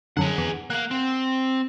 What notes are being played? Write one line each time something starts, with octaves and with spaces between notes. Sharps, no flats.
F#2 D3 G#4 F#5
E2
A#3 F5 F#5 F#6
C4